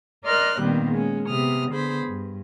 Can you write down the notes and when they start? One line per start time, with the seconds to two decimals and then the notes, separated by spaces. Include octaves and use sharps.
0.24 A#4 D5 D#5 C6 F6 F#6
0.60 A#2 D#3 G3 B3 C4
0.91 G#3 C#4
1.28 C3 B3 D#6 F6
1.71 D3 B3 G#4 C5 B5
2.06 G2